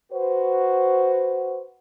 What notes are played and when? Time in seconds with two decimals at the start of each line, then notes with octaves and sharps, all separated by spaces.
0.12 F#4 B4 C5